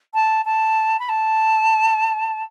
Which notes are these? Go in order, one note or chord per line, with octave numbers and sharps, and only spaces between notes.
A5
A5
B5
A5